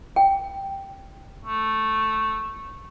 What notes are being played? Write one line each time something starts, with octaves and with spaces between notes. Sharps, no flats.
G5
A3